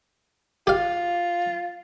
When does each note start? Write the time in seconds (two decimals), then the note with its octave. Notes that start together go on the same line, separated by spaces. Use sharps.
0.67 F4 G4 F5